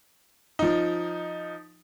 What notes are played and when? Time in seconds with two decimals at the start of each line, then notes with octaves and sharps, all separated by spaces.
0.59 F3 D#4